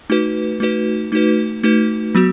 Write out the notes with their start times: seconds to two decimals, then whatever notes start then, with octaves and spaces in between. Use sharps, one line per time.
0.10 A3 D#4 F#4 B4
0.60 A3 D#4 F#4 B4
1.12 A3 D#4 F#4 B4
1.63 A3 D#4 F#4 B4
2.15 F#3 B3 F#4